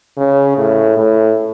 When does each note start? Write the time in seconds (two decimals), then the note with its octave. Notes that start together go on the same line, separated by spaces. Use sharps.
0.17 C#3
0.58 A2
0.97 A2